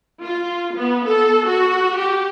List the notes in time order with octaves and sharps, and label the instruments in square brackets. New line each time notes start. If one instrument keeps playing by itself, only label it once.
[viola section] F4
B3
A4
F#4
G4